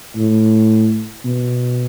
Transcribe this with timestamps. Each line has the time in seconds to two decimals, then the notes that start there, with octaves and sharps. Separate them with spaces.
0.16 A2
1.25 B2